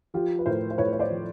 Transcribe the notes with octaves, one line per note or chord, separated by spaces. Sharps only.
F3 F4 G4
B4
A2 A#4 C5
C5
A2 B4 C#5
C#5
C5 D5
F3